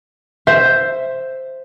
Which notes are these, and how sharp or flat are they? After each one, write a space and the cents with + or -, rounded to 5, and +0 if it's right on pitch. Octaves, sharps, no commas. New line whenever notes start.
C5 +0 E5 +5